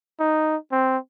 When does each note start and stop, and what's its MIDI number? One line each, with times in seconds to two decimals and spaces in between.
0.20 0.56 63
0.72 0.97 60